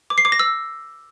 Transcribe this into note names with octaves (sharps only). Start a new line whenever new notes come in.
D6
C7
D6
A#6
E6